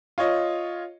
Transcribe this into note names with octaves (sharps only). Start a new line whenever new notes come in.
F4 C#5 D#5